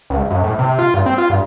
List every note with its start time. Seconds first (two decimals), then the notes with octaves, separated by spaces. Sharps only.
0.10 C#2
0.30 F#2
0.44 A2
0.59 C3
0.79 F4
0.94 G2
1.06 C4
1.18 F4
1.30 G2